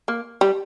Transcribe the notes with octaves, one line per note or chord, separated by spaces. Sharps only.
A#3
G3